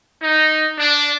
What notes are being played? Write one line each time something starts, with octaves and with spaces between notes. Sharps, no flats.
D#4
D4